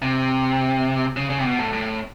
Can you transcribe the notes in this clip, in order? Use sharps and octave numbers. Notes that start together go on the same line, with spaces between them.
C3
C#3
C#3
C3
B2
A2
A2